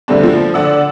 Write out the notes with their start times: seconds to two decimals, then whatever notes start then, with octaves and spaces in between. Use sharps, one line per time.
0.08 D3 G3 A3 C4 D4
0.23 F3
0.54 D3 D5 F#5 E6